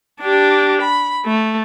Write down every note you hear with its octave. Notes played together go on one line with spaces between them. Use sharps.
D4 G4
B5
A3